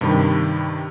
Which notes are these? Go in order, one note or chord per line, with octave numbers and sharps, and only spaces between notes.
G2 C3 D#3 G4 B5